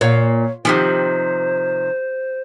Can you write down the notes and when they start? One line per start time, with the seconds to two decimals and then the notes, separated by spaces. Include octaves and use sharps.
0.01 A#2 C#5 F5
0.65 C3 D#3 F3 G4 C5